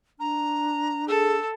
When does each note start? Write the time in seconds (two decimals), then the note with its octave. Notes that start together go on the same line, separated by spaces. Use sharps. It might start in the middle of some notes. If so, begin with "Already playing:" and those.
0.19 D4 A#5
1.08 G#4 A4 E6